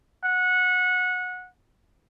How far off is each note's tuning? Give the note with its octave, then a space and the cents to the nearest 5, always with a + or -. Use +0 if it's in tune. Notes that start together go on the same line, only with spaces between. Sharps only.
F#5 -20